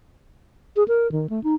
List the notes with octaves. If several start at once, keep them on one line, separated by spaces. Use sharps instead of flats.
G#4
A#4
D#3
A3
D#4